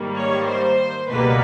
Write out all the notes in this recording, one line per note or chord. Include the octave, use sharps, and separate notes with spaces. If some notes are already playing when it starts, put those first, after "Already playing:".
Already playing: G#2 D#3 G3 A#3
C#5
C5
C#2 B2 G3 A#3 B4